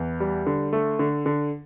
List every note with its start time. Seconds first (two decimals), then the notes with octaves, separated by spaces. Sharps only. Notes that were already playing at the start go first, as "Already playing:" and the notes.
Already playing: E2
0.20 G3
0.47 D3
0.73 A3
0.99 D3
1.26 D3